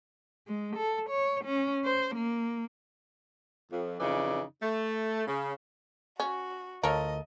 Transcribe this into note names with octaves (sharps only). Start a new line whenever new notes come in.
G#3
A4
C#5
C#4
C5
A#3
F2
F2 C#3 E3 D#4 D5
A3
C#3
C#4 F#4
D2 F3 A4 A#4 C#5 D#5